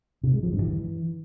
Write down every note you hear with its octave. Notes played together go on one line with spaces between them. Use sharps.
C3
G#3
F3
G2
E3